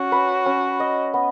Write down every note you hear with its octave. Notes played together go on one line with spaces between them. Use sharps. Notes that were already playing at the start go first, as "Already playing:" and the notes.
Already playing: C#4 F#4
B4
C#4
D#5
B3